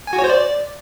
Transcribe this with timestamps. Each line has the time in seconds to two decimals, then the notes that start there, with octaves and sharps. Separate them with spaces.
0.07 G#5
0.13 F#4
0.18 C#5
0.24 C5
0.29 D5